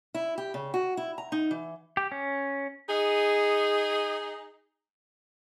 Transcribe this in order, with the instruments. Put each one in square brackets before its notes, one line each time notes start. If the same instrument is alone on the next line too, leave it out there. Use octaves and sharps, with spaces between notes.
[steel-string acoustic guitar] E4
G4
C#3
F#4
E4
A#5
D#4
E3
[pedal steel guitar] G4
C#4
[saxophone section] D#4 G#4